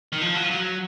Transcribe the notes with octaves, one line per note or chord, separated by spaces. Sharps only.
D#3
F3
F#3
F3
F#3